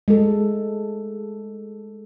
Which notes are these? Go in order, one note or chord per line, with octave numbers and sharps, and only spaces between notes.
G#3 A4